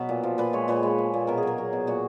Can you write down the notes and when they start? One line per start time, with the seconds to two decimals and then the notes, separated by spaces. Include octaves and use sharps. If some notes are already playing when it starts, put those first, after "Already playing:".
Already playing: B2 F#3 F#4 B4
0.09 A#2
0.23 F3
0.38 A#2 B4
0.53 G#3 C#5
0.68 A#2 B4
0.83 G#3
0.98 G#3
1.14 A#2
1.27 B2 A#4
1.37 G#4
1.43 F#3 A#4
1.58 F#3 G#4
1.73 B2
1.87 A#2 F#4